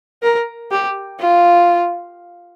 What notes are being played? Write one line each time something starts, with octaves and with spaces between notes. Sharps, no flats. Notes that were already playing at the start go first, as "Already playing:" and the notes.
A#4
G4
F4